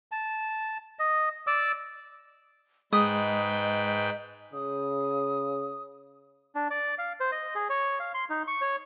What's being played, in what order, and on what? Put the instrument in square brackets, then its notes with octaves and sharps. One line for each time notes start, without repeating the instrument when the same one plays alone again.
[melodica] A5
D#5
D5 D6 E6
[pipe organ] G#2 B4 G5 [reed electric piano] G#3 [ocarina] D#5 [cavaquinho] D#6
[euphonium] C#3 [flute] D#6
[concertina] D4
D5
F5
C5
D#5
G#4
C#5
F5
C6
D#4
C#6
C#5